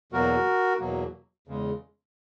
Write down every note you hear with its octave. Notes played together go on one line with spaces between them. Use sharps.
E2 B2 F#3 A#3 F#4 A#4
E2 B2 F#3 A#3
E2 C#3 G#3